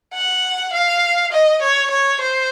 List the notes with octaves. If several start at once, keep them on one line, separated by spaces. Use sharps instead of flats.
F#5
F5
D#5
C#5
C#5
C5